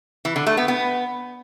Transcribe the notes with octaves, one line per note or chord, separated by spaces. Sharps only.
E3
D3
A3
B3
B3